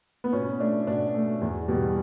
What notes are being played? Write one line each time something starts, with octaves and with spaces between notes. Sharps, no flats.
B3
B2 C#4
A3 D4
B2 D4
A3
E2
B2 G3